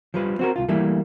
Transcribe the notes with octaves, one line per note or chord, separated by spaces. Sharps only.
F3 G3 B4
C4 F#4 A#4
C2 F4
E3 G3 A3 A#3 E4